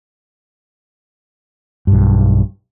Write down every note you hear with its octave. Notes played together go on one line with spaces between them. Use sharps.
B1 G2